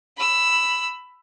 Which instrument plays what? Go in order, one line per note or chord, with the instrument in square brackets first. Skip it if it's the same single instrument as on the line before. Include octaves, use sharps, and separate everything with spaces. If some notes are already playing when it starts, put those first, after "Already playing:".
[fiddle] B5 E6